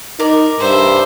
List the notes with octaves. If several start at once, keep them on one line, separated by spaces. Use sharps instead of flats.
D#4 A#4 D5
G2 C5 E5